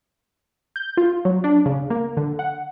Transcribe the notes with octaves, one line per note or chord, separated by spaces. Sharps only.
G6
F4
F#3
D4
C#3
A#3
D3
F#5